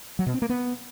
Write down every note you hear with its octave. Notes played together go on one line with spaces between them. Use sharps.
F#3
B2
C4
A#3
B3